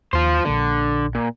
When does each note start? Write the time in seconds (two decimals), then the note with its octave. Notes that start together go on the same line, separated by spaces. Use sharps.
0.13 D#2 F4 C5
0.45 A#1 D3 A#3 D4
1.15 A#2